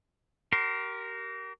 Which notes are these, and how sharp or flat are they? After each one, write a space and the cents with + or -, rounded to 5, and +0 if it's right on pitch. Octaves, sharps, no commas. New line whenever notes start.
G4 -40 A#4 +0 C6 +0